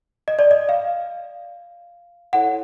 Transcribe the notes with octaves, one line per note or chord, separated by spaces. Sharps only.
D#5
D5
D#5
F5
E4 A4 C#5 F#5